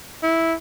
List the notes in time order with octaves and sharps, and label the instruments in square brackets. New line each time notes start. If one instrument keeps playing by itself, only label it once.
[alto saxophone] E4